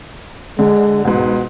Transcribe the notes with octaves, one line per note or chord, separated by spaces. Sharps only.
D3 G#3
C#2 G#2 B2